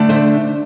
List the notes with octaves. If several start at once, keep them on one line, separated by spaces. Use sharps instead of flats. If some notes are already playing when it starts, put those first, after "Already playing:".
Already playing: D3 A3 D4
C5 E5